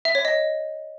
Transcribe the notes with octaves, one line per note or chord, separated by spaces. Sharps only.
E5
C#5
D#5